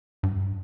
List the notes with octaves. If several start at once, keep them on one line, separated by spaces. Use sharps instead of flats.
G2